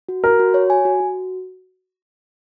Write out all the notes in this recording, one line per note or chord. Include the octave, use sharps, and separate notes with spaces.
F#4
F#4 A#4
F#4
C#5
G#5
F#4
F#4